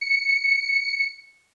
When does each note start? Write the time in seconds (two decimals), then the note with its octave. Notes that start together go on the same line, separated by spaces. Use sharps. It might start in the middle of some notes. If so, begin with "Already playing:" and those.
0.01 C#7